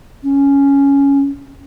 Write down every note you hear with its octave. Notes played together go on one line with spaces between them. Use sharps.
C#4